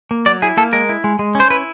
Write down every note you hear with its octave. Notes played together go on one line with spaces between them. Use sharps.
A#3
F#3 D5
E4 G#4
A#3 A4
G#3 A#4
E4
G#3
G#3
C#4
C5
E4 B4